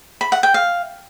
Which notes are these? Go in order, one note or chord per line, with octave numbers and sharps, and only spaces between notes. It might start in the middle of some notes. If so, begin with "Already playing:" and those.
B5
F#5
G5
F5